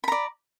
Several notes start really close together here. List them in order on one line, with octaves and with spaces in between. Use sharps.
B5 A#5 D5